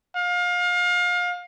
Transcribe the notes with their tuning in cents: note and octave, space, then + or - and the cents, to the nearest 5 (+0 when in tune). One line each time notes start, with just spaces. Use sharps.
F5 +30